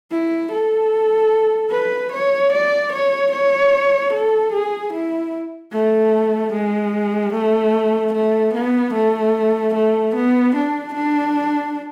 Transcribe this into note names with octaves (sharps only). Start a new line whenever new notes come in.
E4
A4
B4
C#5
D5
C#5
C#5
A4
G#4
E4
A3
G#3
A3
A3
B3
A3
A3
B3
D4
D4